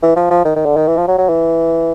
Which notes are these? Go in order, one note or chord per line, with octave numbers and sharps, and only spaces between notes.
E3
F3
F3
D#3
D#3
D3
D#3
E3
F3
F#3
F#3
E3